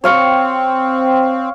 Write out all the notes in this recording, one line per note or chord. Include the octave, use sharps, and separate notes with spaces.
C4 C#5 F5 C#6